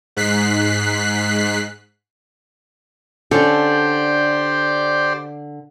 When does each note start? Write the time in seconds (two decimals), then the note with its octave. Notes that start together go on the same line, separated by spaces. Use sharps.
0.17 G#2 F#6 B6 C7
3.31 D3 C#4 G4 A4 C5 D5